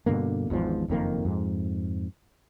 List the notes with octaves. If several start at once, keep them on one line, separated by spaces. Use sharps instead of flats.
G2 B2 D3 A#3
G#1 E2 G#2 F3
F#1 F2 D#3 A#3
F2 G#2